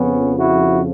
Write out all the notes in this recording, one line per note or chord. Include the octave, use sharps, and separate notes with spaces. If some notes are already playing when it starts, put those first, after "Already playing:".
Already playing: F2 C#3 F3 B3 C#4
E4 F#4